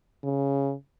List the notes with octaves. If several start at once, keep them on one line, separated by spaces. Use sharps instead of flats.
C#3